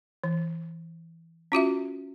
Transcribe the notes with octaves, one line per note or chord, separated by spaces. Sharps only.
E3
C#4 F4 F#4 E5